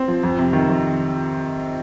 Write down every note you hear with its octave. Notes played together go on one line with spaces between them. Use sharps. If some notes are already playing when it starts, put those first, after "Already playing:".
Already playing: C4
F3
F2
C3
D#3
F2